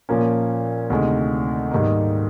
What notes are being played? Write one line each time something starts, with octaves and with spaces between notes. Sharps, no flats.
A#2 F3 A#3 C#4
D2 C3 D#3 G#3
G#2 D#3 G3 A#3 D#4